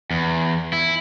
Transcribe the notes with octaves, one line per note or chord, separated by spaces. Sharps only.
E2
E4